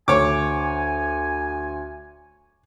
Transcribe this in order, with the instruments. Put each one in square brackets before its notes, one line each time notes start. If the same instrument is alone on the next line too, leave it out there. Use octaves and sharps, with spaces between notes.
[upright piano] D2 [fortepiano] C#5 D6 [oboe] G#5